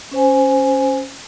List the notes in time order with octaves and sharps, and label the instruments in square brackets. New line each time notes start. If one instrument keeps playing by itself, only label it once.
[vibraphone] C#4 C5 G#5